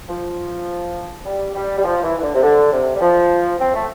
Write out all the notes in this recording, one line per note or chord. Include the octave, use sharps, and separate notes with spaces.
F3
G3
G3
G3
F3
E3
E3
D3
C3
D3
C3
G3
F3
C4
A3